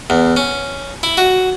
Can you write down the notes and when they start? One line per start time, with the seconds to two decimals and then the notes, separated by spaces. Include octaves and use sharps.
0.10 E2
0.37 C#4
1.03 E4
1.17 F#4